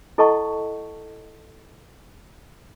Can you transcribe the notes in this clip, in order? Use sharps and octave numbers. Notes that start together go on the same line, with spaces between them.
E4 A4 D#5 F#5 A5 C#6